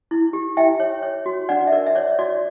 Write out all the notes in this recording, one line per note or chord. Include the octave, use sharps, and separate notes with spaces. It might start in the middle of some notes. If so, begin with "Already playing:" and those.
E4
G4
E4 E5 G5
C#5
C#5
F#4
D4 D5 F#5
E5
A#4 D5
E5
C#5 D5
F#4 D5